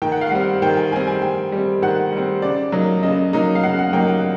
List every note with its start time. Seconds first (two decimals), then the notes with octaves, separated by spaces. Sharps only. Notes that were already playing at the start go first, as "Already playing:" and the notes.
0.02 D#3 G5
0.12 F#5
0.21 F5
0.31 G3 C4 F#5
0.62 D#3 G5
0.77 G#5
0.92 G3 C4 G#5
1.07 G#5
1.22 D#3 G5
1.52 G3 C4
1.82 D#3 F#5
2.12 G3 C4
2.42 C#3 D5
2.72 F#3 A#3 D#4
3.03 C#3 D#5
3.33 F#3 A#3 D#4
3.55 F5
3.63 C#3 F#5
3.79 F#5
3.93 F#3 A#3 D#4 G5
4.08 F#5